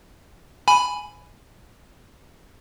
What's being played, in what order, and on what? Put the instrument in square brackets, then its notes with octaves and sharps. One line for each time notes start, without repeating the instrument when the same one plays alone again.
[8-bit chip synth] G#5 B5